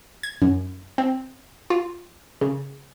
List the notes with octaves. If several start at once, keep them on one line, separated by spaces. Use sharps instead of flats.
G#6
F#2
C4
F4
C#3